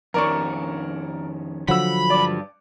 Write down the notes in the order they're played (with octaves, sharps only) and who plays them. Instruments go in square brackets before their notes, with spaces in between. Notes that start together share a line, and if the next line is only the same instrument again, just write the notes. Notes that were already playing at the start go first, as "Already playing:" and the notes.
[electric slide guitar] F2 D#3 C#4 [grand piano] A#4 D5 C#6
[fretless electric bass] D3 F3 F#3 [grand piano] F#5 E6 [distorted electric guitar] B5
[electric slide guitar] G2 D5 [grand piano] D6